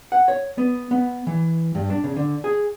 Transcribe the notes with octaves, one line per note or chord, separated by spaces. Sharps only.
F#5
C#5
B3
B3
E3
G2
D4
C#3
D3
G#4